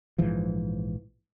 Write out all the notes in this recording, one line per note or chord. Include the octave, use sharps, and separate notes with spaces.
A#1 G#2 E3 F3